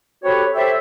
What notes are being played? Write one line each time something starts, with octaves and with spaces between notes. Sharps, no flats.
C4 F#4 G4 A4 B4 C#5
G4 A4 C5 C#5 E5